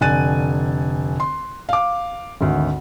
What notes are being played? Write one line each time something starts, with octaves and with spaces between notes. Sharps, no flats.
F1 D3 G#5 F#6 A6 D#7
C6
F5 D6
G#1 D2